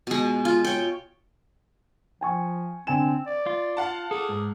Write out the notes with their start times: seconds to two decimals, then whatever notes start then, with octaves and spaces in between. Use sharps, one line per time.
0.07 B2 G#3
0.45 F4
0.64 C#5 G5
2.21 F3 G5 G#5 C#6
2.87 D3 C4 G#5 E7
3.26 D5
3.46 F4
3.77 F5 F#5 A5
4.11 G#4 A4
4.29 G#2